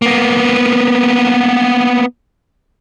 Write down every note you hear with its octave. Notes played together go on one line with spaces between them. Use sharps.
A#3 B3